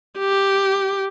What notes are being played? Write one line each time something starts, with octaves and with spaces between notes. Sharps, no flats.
G4